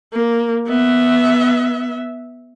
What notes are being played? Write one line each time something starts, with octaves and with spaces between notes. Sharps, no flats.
A#3
B3 E5